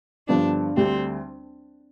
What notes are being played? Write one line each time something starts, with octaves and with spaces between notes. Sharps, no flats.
G2 D3 F3 B3 D4
D2 D3 G3 C4 D4 G4